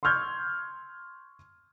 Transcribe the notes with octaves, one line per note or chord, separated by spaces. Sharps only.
C6 C#6 E6 F6 G6 G#6